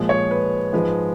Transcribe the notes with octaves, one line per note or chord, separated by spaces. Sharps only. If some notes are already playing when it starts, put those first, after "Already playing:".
Already playing: A#2 F3 G#3
C#5
B4
G#2 F3 G#3 B4